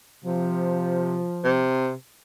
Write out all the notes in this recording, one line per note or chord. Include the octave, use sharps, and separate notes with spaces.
C3 F3
C3